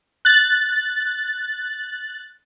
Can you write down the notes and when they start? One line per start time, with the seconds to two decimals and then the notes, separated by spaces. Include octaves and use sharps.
0.25 F#6 A6